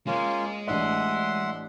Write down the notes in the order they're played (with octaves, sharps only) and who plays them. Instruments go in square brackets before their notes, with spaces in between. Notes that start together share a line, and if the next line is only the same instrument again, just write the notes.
[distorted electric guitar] G#3 [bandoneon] A#3 C#4 F4
[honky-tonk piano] A1 D4 D#5 [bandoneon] E5 F#5 C6